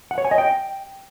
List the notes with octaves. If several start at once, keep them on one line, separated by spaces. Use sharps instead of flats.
F#5
C#5
G#5
D#5
G5